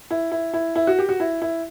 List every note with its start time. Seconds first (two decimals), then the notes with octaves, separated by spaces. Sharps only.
0.11 E4
0.32 E4
0.53 E4
0.76 E4
0.87 F#4
0.99 G4
1.09 F#4
1.20 E4
1.42 E4